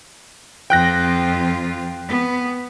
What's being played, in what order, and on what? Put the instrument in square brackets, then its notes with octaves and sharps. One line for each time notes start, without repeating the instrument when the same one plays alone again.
[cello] F2 F4 [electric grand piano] G5 F#6 A#6
[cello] B3